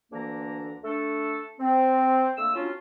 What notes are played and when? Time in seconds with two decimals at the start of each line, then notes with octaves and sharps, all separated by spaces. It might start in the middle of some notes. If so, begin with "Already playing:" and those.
0.12 D2 D3 E3 A#3 D4 A#5
0.84 A3 D4 A4
1.60 C4
2.37 D3 A3 A#3 E6
2.55 F#3 C#4 D4 F4